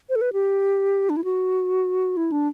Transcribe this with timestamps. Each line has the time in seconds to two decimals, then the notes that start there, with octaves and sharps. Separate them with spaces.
0.09 C5
0.16 A4
0.21 B4
0.33 G4
1.10 D4
1.17 E4
1.24 F#4
2.17 E4
2.32 D4